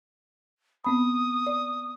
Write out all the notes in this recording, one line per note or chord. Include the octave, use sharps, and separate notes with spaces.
B3 C4 B5 D#6
D5